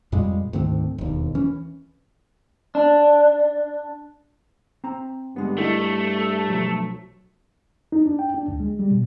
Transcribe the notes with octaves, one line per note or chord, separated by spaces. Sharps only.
F2 A#2 G3 G#3
D2 G#2 D#3 C4
E1 D#2
E3 C#4
D4
C4 A#5
G2 D3 G#3 B3
A3 E4 D#5
B1 F3 F#3
D#4
D4
G5
D4
D2
G#3
G3
B2